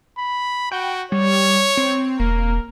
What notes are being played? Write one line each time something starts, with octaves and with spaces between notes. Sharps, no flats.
B5
F#4 G5
G3 C#5
C4
E1 A#3 A#4